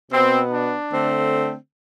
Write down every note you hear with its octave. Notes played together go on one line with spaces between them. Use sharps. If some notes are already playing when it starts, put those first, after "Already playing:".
B2 B3 C4
D4
D3 A3 C4